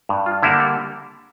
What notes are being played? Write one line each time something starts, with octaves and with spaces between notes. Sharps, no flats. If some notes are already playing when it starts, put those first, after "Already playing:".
G2
F4
D3 G3 A#3 E4
A4